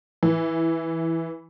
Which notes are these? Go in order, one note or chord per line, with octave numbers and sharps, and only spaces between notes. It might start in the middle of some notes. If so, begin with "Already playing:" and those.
E3